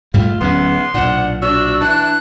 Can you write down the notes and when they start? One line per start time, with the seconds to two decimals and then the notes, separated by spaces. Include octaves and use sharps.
0.14 G#2 G3 A3 F4
0.40 D1 F#3 B3 C#4 C6
0.94 B1 A#2 D4 F#5
1.42 D4 F#4 E6
1.81 E3 D4 F#6